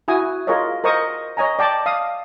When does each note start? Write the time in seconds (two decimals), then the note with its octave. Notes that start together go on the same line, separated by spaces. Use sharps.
0.08 E4 F#4 G#5 D#6
0.47 F4 G#4 A#4 C#5 D#5
0.84 A#4 C5 D#5 C#6 D#6
1.37 C#5 D#5 G#5 A#5
1.59 D5 G5 A5 D6
1.86 F5 D#6